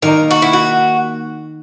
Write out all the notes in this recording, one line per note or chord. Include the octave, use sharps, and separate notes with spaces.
D#3 A#3 D#4 A#4
F#4
E4
F#4